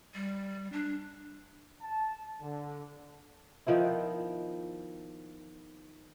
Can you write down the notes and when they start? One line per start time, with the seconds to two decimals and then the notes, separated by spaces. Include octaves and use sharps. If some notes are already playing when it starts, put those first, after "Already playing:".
0.15 G3
0.73 D4
1.82 A5
2.41 D3
3.67 D#3 F3 B3 E4